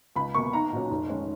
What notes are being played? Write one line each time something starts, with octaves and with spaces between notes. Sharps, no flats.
C#2 B5
B2 A#3 C#6
B1 A#5
A#2 F#3 C#4
F1
D#3 G#3 C#4